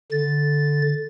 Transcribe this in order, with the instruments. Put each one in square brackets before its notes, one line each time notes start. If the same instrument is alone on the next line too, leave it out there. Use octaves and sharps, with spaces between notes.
[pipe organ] D3 A6